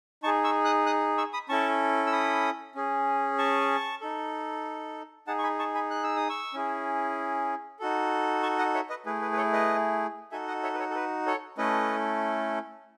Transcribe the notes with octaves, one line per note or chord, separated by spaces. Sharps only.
D#4 G#4 A5 C#6
C#6 E6
D#6 F#6
D#6 F#6
C#6 E6
B5 D#6
C#4 E4 A4 A5 C#6
E6
B5 D#6
C#4 G#4
A5 C#6
D#4 A4
D#4 G#4 F#5 A5
C#6
G#5 B5
A5 C#6
G#5 B5
F#6
E6
D#6
C#6 E6
C#4 E4 G#4
D#4 F#4 A4
A5 C#6
D#5 F#5
C#5 E5
B4 D#5
A3 E4 G#4 B4
B4
B4
A4 C#5
B4 D#5
D#4 F#4 A4 E5 G#5
D#5 F#5
C#5 E5
B4
A4 C#5
A4
B4
A4 C#5
A3 C#4 E4 A4 B4 D#5